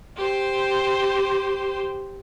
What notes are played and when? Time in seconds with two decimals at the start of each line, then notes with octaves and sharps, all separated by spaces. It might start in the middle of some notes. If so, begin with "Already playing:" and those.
0.17 G4 C5